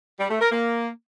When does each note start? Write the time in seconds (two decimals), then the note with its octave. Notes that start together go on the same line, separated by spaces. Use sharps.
0.20 G3
0.30 A3
0.41 A#4
0.52 A#3